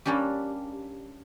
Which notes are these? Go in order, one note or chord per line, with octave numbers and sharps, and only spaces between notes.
G3 A#3 C#4 D4 G4